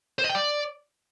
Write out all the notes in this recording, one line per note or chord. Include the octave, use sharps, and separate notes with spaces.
C5
D#5
G5
D5